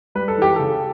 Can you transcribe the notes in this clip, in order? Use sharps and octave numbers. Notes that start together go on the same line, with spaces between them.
G3 B4
A4
E3 G4
C#3 A4